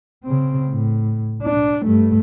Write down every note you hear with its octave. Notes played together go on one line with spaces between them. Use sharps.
C#3 C4
A2
D4
G2 A3